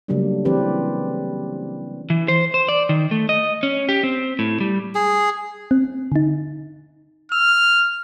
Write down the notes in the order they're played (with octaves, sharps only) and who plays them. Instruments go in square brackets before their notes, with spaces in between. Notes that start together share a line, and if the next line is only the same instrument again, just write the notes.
[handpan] C#3 F#3 G3 A3 A#3 D4
E3 C4 G4 B4 D5
[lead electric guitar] E3
C5
C5
D5
D#3
A3
D#5
C#4
G4
C4
A2
G3
[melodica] G#4
[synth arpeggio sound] C4
D3 D#4
[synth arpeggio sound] E6 [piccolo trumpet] F6